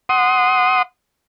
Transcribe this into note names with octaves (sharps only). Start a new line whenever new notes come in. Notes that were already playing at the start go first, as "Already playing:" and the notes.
F#5 C6 D#6